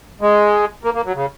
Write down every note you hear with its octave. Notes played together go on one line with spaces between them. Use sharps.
G#3
A#3
A#3
F#3
C#3